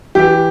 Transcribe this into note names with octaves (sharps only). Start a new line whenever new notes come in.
E3 G4